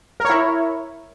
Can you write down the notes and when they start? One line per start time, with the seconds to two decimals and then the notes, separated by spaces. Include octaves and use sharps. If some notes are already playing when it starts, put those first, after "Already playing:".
0.20 A#4
0.25 C#5
0.30 E4